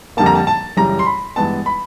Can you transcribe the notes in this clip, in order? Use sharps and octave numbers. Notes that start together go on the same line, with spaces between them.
F2 D3 G3 A#3 A5
A#5
A5
A5
F#2 C#3 E3 G3 A#5
C6
B5
G2 E3 G#3 B3 A5
B5